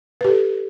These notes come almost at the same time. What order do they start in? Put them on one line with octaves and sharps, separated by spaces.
B4 G4 A4